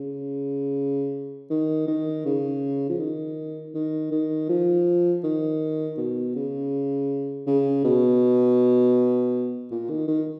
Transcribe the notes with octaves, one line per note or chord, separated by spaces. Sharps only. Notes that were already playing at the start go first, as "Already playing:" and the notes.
Already playing: C#3
D#3
D#3
C#3
F3
D#3
D#3
D#3
F3
D#3
B2
C#3
C#3
B2
A#2
D#3
D#3